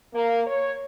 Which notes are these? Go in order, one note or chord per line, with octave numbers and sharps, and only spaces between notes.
A#3
C#5